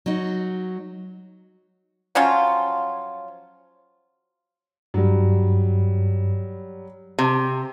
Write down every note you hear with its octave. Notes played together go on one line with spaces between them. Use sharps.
F#3 D#4
F3 F#3 C#4 F4
G2 F#3 G3
C3